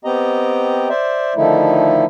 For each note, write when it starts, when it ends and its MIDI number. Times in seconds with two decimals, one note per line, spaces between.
0.05 0.89 59
0.05 0.89 60
0.05 0.89 67
0.05 0.89 75
0.05 0.89 82
0.89 1.34 72
0.89 1.34 74
0.89 1.34 76
1.36 2.05 50
1.36 2.05 51
1.36 2.05 53
1.36 2.05 57
1.36 2.05 63
1.36 2.05 64